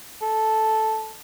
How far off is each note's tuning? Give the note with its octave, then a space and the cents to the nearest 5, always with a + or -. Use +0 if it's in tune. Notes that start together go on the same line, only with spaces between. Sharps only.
A4 -5